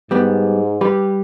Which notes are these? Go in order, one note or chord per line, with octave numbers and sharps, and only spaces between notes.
G#2 G3 B3
G3 G4 B4